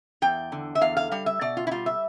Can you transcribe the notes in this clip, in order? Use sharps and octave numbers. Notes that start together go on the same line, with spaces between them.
E2 G5
D3
E5
E2 F5
F5
G3 F5
E5
B2 D5
F4
E4
G3 F4
E5